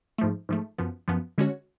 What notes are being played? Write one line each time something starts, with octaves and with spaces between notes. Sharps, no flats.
G#2 F3 A3
G#2 F3 A3
F#2 F3 B3
F#2 F3 B3
D3 G#3 C#4 F#4 C#5